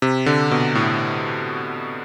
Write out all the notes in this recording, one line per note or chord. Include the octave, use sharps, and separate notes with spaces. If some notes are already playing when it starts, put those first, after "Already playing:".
C3
D3
B2
A2